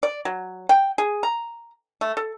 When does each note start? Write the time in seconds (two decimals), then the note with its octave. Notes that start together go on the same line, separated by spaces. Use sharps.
0.03 D5
0.25 F#3
0.69 G5
0.98 G#4
1.23 A#5
2.01 A3
2.17 A4